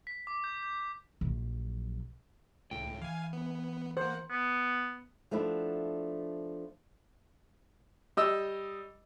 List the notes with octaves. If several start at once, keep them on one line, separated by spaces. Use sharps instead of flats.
B6
D6
G6
G6
A#1 F#3
C#2 A2 G5
E3 F5 G#5
B3
A#3 C5 F#5
B3
F3 A3 B3 D4 E4
G3 D#5 E6